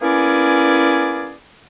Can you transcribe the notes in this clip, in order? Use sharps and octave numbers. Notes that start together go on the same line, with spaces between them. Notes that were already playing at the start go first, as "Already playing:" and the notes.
A#3 B3 C#4 E4 G#4 D5